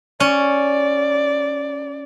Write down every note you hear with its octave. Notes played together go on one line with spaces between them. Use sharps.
C#4 D5